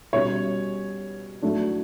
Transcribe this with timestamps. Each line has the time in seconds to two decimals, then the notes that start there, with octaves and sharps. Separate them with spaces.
0.13 B2 G3 C#4 C#5
1.42 A2 F#3 A3 D4